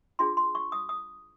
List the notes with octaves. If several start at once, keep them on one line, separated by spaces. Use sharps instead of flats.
D4 F4 G#4 C6
C6
C#6
D#6
D#6